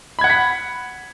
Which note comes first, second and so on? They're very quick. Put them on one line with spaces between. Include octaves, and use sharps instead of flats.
B5 G#6 F#5 F#6 B6